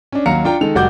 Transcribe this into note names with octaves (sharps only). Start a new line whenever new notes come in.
C#4 D4
D#2 F#3 F#4 F5 A#5 C#7
D4 F4 G5 A#5
D#3 G#3 A4 F7
F1 G3 F#4 F#5 D6 G6